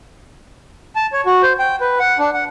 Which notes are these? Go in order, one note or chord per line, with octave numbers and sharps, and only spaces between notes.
A5
C#5
F#4
C5
G5
B4
F#5
D4
F#5